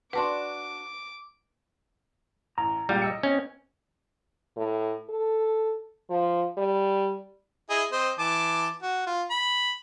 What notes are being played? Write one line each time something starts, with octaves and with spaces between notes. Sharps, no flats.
D4 F#4 B4 F#5 A5 C6 D6
A1 A#5
C#2 A#2 G3
D#5 E6 C#7
C4 C#4 D#5 G#6
A2
A4
F3
G3
E4 G#4 D#5
C4 C5 D#5
E3 A5 D6
F#4
F4
B5